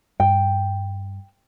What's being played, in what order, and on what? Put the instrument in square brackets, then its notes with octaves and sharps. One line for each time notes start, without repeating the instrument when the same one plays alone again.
[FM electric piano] G2 [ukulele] G5